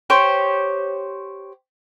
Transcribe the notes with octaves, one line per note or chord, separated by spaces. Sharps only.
G4 C5 C#5